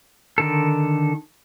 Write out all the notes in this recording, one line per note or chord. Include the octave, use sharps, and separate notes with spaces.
D3 D#3 A4